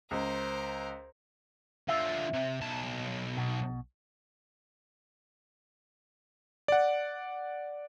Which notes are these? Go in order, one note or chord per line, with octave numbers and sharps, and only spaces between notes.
C#2 A#4 C5
D3 F4 E5
C3
B1 A5
B2
D5 F#5